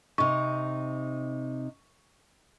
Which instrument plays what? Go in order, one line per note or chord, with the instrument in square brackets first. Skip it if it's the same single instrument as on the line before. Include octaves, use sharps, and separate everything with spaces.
[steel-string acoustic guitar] C3 D#4 [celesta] C#6